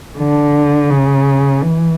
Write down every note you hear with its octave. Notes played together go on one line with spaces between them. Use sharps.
D3
C#3
E3